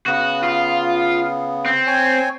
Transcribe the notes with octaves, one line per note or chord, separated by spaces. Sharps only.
C#3 B3 F#4
F4
C4
C#5 G5 G#5